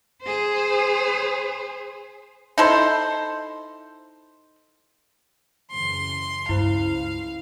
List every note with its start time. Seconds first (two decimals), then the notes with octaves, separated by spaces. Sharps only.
0.22 G#4 C5
2.58 D#4 E4 A4 C5
5.71 F#2 C#3 E3 C6
6.49 C#2 G2 E4 C5 F5 B5